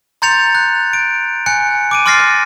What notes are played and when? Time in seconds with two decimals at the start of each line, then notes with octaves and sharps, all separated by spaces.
0.22 A#5 C6 G6 A6 C#7 F7
0.55 F#6
0.93 D7
1.46 G#5 F#6 C#7
1.91 D6 D7 D#7
2.06 C6 D6 F6 A6 A#6 C7